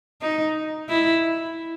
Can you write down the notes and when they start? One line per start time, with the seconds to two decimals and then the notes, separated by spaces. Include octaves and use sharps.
0.22 D#4
0.90 E4